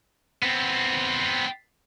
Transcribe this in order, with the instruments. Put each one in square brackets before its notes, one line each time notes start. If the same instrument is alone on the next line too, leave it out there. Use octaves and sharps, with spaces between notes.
[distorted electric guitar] B3 C4